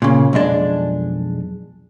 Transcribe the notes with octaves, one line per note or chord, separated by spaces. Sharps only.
A#2 C#3
B1 F2 G#3 D4